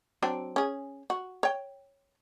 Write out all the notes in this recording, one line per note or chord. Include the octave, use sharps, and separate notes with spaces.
F#3 C4 D4
C#4 G#4
F#4
C#5 G5